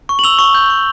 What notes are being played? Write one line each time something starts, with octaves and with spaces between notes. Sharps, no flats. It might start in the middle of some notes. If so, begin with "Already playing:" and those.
C#6
F#7
E6 F7 G7
C#6
G6
C#6